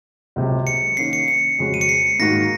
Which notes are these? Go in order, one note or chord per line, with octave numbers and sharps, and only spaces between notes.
C#2 C3 F#3
C#7
D#3 A#3 C#4 C7
C#7
C#7
F2 C#3 G#3 C#4 F#4
D#7
C#7
C7
G#2 D#3 A#3 D#4 F#4 A#6